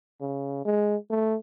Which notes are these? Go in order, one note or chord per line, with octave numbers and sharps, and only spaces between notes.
C#3
G#3
A3